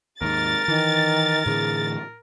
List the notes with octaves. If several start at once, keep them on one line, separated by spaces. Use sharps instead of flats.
D#2 G#2 A#4 A6
D#3 E3
A2 D3 E3 G#4